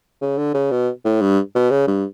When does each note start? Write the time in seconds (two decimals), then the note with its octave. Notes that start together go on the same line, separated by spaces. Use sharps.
0.21 C#3
0.38 D3
0.54 C#3
0.71 B2
1.05 A2
1.21 G2
1.55 B2
1.71 C#3
1.87 G2